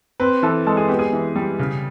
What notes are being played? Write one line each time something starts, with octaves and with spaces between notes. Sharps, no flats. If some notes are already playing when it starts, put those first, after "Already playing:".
C4 B4
E3 A4
G#3 A4
G#4
B3 G4
G#4
E3
G3
C#3